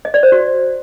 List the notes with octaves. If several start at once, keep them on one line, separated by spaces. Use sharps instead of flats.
D#5
D5
C5
F#4